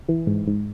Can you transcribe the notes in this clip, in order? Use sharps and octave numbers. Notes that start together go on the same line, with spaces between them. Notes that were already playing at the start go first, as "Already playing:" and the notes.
E3
G#2
G#2